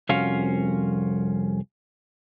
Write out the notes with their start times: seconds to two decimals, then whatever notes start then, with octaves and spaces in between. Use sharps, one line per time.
0.09 C2 F2 C#4 F4 F#4 F5